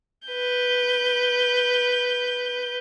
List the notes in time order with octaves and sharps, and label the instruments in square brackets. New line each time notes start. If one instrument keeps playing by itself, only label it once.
[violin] B4 G6